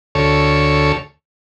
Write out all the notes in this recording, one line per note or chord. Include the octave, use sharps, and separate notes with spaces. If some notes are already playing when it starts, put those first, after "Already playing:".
D2 A4 C#5